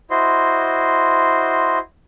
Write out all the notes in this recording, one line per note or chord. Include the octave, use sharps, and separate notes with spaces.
E4 F#4 C5 D#5 C6